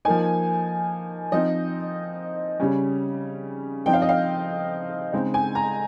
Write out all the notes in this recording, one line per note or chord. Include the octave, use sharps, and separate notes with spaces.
F3 A#3 D#4 G#5
F3 C4 D#4 D#5
C#3 G3 C#4
F3 C4 D#4 G5
F5
D#5
F5
C#3 G#3 C4 D#4
G#5
A#5